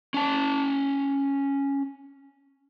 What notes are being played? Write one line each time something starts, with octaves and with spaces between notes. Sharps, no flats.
C#4 A5